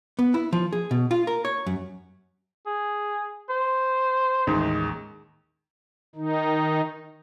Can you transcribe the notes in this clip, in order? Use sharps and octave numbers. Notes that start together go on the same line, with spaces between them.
B3
E4
F3
G#4
B2
F4
A#4
C#5
F#2
G#4
C5
A1 D#2 G#3
D#3 D#4